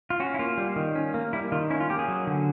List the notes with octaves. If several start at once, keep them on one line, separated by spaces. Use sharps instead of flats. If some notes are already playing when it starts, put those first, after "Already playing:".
F4
C#4 F#4
E4
A#3 F4
G3
D#3
C#4
A#3
G3 E4
D#3 F4
C#4 E4
F4
A#3 G4
G#4
F#3
D3